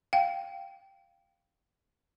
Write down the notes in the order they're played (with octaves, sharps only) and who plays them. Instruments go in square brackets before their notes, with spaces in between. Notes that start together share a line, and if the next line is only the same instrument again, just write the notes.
[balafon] F5 G5